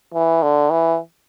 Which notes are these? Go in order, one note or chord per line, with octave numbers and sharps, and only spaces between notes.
E3
D3
E3